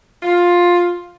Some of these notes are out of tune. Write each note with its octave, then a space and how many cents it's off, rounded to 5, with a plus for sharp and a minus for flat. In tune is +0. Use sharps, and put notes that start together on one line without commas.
F4 +10